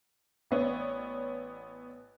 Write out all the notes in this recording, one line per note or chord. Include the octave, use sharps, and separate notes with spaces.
A1 B3 C#5 D5